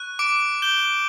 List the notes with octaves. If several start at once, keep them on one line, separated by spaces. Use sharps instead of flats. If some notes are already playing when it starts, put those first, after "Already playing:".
Already playing: C#6 F#6
D6 D7
G6 G7